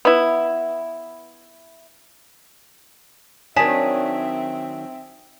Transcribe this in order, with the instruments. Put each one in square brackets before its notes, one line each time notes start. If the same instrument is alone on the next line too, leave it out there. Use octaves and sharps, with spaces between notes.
[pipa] B3 E4
[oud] D#3 F#3 D4 [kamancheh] C4 E5 [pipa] G#4 [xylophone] A5 B6